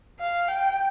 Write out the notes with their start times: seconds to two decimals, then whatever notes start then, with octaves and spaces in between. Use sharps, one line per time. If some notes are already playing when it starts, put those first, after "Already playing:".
0.20 F5
0.48 G5